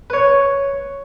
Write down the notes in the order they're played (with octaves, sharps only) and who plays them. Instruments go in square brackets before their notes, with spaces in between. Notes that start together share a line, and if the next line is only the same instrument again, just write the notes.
[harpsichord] B4 C#5